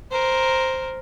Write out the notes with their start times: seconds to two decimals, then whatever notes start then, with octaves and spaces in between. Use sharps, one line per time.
0.11 A#4 C5